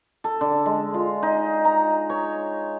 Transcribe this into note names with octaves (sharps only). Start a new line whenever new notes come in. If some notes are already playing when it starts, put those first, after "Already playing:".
A4
D3
G#3
F4
D#4
A#5
C#5